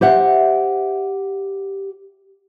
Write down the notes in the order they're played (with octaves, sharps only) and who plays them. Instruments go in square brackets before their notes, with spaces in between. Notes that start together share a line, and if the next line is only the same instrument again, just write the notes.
[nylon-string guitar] G4 C5 E5 F#5